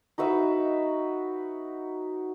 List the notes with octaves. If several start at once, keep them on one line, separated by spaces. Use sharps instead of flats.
D#4 F#4 B4 E5